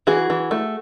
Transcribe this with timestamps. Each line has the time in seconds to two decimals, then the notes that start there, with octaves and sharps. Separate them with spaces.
0.07 E3 F#4 G#4
0.30 E3
0.51 A3